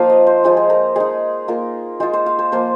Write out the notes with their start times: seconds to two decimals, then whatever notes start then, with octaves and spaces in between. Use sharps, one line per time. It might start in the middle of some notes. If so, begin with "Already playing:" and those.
Already playing: F3 A#3 D#4 F5
0.10 D#5
0.27 C5
0.44 F3 G#3 D#4 G#4
0.57 G#4
0.70 A#4
0.96 G#3 D#4 G#4
1.48 A#3 F4 A#4
2.00 G#3 F4 C5
2.13 C5
2.26 F5
2.39 C5
2.52 F3 A#3 F4 C5